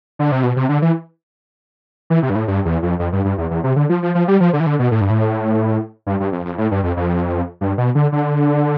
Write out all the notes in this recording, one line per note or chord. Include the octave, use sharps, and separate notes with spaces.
D3
C3
B2
C3
D3
E3
E3
C3
G2
A2
G2
E2
F2
F2
G2
G2
E2
E2
C3
D3
F3
F3
F3
G3
F3
D3
E3
D3
B2
A2
G2
A2
G2
G2
F2
F2
A2
G2
F2
F2
G2
B2
D3
D3